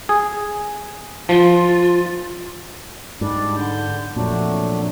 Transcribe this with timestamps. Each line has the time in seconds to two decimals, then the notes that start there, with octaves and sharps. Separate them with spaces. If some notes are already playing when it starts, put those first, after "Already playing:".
0.09 G#4
1.29 F3 F4
3.21 G#2 G3 D4 D5
3.56 D3 G6
4.16 F2 A#2 F#3 A3 D4